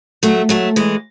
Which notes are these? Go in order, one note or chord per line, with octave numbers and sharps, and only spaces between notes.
F#3 A3
F#3 A3
E3 G#3